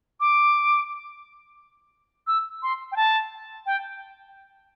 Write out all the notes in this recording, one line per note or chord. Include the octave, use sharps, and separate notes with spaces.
D6
E6
C6
G5
A5
G5